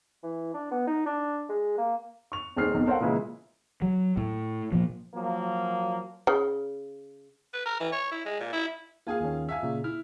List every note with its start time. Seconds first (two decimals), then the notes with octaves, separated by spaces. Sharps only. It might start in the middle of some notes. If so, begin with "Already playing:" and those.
0.23 E3
0.54 D4
0.71 B3
0.87 D#4
1.06 D4
1.49 G#3
1.77 A#3
2.32 C#6 F7
2.57 D#1 D#2 G#4 C5 F6 C7
2.74 B1 F2 G#2
2.86 A4 A#4 C5 C#5 F5 F#5
3.00 A#2 C#3 E3 G#3 A#3 E4
3.82 F#3
4.17 A2
4.72 A#2 F3
5.14 F3 F#3 A#3
6.27 C#3
7.53 B4
7.66 A#4
7.80 E3
7.92 C#5
8.11 E4
8.25 G#3
8.40 A#2
8.53 E4
9.07 A#3 F4 G#4 F5 G#5
9.20 D#2 D#3 C#4
9.49 E5 F5 G#5
9.63 A#2 C#3
9.84 E4 F6